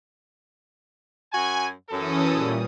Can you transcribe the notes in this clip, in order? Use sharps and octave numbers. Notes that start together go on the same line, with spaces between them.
F#2 F#4 G#5
F#2 E3 C#4 A4 D#6
A#2 G3